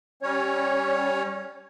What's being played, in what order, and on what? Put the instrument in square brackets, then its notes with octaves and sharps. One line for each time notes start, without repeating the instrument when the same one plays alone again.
[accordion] G3 C#4 C#5